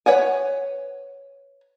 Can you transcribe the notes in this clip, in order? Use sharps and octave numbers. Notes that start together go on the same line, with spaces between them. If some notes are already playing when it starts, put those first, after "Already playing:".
B4 C#5 F#5 G#5